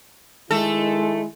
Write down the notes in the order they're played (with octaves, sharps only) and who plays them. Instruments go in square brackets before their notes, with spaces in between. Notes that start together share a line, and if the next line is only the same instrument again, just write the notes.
[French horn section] D#3 E4 [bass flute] G#3 [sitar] A3 A4